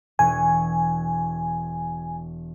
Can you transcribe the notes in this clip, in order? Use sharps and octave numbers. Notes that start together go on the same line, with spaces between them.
E1 G#5 C#6